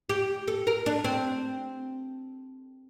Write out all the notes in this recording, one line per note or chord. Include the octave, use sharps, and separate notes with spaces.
G4
A4
A#4
D4
C4